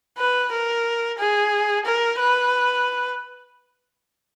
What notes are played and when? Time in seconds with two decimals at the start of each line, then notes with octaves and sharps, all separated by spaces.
0.18 B4
0.52 A#4
1.18 G#4
1.85 A#4
2.19 B4